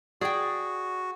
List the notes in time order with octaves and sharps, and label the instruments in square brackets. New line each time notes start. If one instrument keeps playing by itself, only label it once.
[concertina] F#4 [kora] G#4 [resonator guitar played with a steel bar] D5 G5